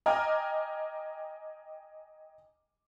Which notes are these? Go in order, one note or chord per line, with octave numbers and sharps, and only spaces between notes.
D#5 G5 G#5 A#5 D6 F6